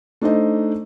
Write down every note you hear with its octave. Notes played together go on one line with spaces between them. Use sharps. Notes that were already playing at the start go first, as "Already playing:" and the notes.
A3 D4 D#4 C5 D#5